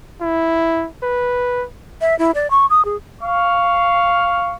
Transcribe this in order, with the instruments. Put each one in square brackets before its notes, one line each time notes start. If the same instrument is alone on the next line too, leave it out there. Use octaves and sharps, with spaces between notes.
[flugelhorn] E4
B4
[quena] E5
E4
D5
C#6
D#6
G#4
[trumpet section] F5 C#6